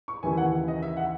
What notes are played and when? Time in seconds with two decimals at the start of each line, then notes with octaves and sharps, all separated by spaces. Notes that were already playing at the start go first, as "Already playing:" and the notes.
0.08 C#6
0.23 D#2 C#3 E3 A#3 E4 G#5
0.37 F#5
0.68 D#5
0.82 E5
0.97 F#5